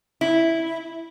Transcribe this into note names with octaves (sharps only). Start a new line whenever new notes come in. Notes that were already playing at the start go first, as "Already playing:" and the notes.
E4